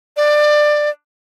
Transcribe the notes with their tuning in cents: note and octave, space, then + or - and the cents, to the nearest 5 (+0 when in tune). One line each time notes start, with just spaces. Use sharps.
D5 +20